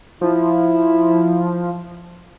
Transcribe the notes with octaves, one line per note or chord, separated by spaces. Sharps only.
F3 E4